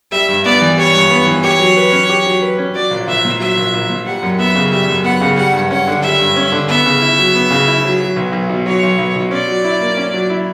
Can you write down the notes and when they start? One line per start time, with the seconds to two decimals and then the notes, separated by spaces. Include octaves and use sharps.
0.12 G3 E5
0.29 G2
0.45 B3 D5
0.61 E3
0.77 G3 C#5
0.95 G2
1.11 B3
1.26 E3
1.43 G4 C#5
1.59 F#3
1.77 B4
1.92 C#4
2.09 G4
2.26 F#3
2.42 B4
2.58 C#4
2.75 F#3 D5
2.91 A#1
3.07 A#1 E5
3.25 A#2
3.40 F#3 E5
3.57 A#1
3.73 A#1
3.89 A#2
4.06 G3 F#5
4.22 F#2
4.38 B3 E5
4.55 C#3
4.72 G3 E5
4.89 F#2
5.04 B3 F#5
5.21 C#3
5.37 G3 F#5
5.53 G2
5.70 C#4 F#5
5.87 D3
6.03 G3 E5
6.19 G2
6.36 C#4
6.52 D3
6.69 B3 E5
6.85 C#3
7.02 E4
7.19 F#3
7.35 B3
7.50 C#3
7.67 E4
7.84 F#3
8.00 F#3
8.16 B1
8.32 B1
8.50 B2
8.66 F#3 C#5
8.83 B1
8.98 B1
9.16 B2
9.31 C#4 D5
9.48 F#3
9.64 E4
9.81 A#3
9.97 C#4
10.14 F#3
10.30 E4